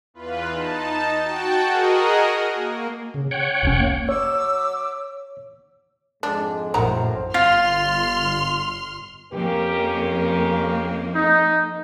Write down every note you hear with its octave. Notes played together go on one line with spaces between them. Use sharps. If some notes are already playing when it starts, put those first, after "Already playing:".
E2 F4 B4
D#4 A5
F#4 G5 A5
F#4 G#4 A#4 D#5
A#3
C#3
C#5 F#5 G5
F1 C2 C#4
A#3
F#3 C#5 D6 E6
F2 G#2 G#3 D4
A#1 F#2 A2 D#3 F#3 A#4 C5 A#5
G1 F4 C6 F6
F2 A#3 C#4 G4 A#4
D#4